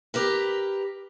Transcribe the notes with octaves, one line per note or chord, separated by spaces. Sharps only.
G4 A#4 B4